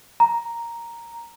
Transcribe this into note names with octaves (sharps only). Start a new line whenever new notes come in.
A#5